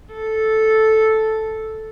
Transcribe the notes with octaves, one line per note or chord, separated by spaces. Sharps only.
A4